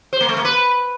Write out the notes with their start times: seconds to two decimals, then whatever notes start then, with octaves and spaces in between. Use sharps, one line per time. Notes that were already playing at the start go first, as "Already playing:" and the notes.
0.13 C5
0.21 A#3
0.29 A3
0.37 A#3
0.45 B4